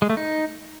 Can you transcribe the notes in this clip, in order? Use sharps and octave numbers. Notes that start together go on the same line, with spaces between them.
G#3
A3
D#4